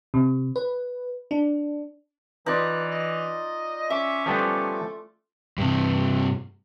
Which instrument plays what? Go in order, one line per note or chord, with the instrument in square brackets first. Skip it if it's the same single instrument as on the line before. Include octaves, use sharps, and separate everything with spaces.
[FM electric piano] C3
B4
D4
[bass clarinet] E3 [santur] D#4 F4 D5 [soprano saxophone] B4
[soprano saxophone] D#5
[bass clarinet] C#4 [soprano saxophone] E5 [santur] D6
[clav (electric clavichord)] F3 G3 B3 [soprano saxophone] A3
[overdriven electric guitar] G2 C3